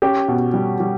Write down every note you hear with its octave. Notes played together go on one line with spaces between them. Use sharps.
C#4 G4
B2
G3
G3